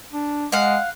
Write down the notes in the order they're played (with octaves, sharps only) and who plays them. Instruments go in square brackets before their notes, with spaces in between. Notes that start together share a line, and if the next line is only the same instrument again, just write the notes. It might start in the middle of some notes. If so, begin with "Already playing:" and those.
[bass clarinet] D4
[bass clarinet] G#3 [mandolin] F5 F#5